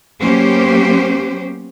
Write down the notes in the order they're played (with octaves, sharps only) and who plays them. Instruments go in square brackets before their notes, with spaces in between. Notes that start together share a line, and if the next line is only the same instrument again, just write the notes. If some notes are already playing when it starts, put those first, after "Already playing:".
[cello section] F#3 A#3 B3 C#4 G4 C5